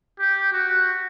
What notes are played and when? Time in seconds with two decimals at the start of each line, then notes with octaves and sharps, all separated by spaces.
0.19 G4
0.52 F#4